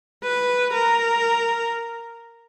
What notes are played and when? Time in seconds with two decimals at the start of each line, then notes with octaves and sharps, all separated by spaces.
0.24 B4
0.74 A#4